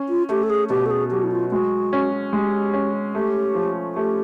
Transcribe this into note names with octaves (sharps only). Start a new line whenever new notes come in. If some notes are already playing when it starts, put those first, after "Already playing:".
Already playing: C#4
F4
A3 G4
A4
G#4
B2 G4
A4
G#4
F#3 G4
E4
F4
G#3 F#4
C#4
G#3 G4
C#4
A3 G4
F3
A3 G4